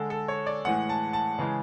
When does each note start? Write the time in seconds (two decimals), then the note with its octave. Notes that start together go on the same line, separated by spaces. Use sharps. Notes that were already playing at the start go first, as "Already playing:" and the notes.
Already playing: D3 G#3 A4
0.10 A4
0.28 C#5
0.46 D5
0.65 A2 E3 G#3 F#5
0.89 A5
1.13 A5
1.38 C#3 E3 G#3